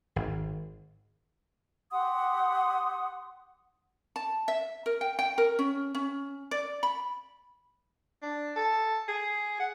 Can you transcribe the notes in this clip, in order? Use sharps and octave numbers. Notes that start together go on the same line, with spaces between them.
G#1
G4 F#5 C6 D#6
A5
E5
A#4
G5
G5
A#4
C#4
C#4
D5
B5
D4
A4
G#4
F#5